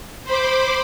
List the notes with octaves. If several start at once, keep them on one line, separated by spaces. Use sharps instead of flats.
C5 B5 D6